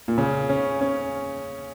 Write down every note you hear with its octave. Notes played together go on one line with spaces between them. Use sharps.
A#2
C#3
C#4
C#4